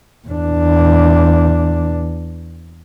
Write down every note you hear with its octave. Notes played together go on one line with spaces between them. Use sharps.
E2 D4